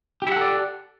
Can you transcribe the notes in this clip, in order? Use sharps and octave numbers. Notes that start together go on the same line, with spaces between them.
E4 G4 A4 D5 F#5